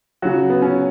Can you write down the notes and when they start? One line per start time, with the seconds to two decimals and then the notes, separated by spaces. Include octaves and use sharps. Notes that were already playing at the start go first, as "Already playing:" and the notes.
0.22 C#3 F#3 F#4
0.50 B3
0.62 C#4